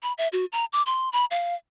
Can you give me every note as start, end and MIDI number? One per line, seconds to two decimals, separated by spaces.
0.03 0.13 83
0.18 0.28 76
0.33 0.45 66
0.52 0.65 82
0.73 0.83 86
0.86 1.09 84
1.13 1.25 83
1.31 1.55 77